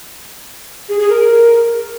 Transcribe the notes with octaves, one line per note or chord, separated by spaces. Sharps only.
G#4
G#4
A#4